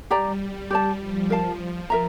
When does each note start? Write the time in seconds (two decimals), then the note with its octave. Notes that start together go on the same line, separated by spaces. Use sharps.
0.10 G3 G4 D5 G5 A#5
0.70 G4 D5 A5
1.01 F3
1.30 F3 A#4 F5 A5
1.90 A#4 E5 A#5